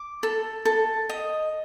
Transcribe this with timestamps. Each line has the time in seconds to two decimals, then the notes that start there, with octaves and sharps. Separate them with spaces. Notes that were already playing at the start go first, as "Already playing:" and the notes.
Already playing: D6
0.23 A4
0.65 A4
1.09 D#5